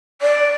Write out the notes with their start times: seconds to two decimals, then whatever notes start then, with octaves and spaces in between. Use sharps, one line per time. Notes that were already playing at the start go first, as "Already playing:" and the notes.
0.22 D5